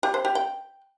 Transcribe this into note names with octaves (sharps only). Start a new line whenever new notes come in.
G4
C5
G4
G5